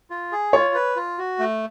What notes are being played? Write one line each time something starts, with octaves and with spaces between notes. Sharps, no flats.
F4
G#4
F4 C#5
B4
F4
F#4
A3